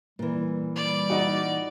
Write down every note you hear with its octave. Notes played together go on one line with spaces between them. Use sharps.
A#2 E3 G3
G3 D5
D#4 F#4